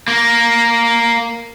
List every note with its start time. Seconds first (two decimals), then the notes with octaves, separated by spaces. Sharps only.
0.08 A#3